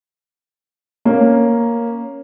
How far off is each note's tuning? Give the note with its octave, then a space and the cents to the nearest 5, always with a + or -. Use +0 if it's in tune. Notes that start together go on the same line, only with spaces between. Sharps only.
A#3 +0 C#4 +0